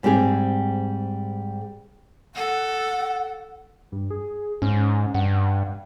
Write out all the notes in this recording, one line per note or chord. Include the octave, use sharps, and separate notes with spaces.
G#2 G3 C4 G4 G#4
A4 F#5
G2
G#4
G#2 C#4
G2 F#5